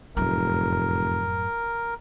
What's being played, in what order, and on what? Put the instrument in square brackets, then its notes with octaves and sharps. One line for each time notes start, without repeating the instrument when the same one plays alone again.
[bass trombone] F1 [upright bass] F#2 A2 [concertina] A#4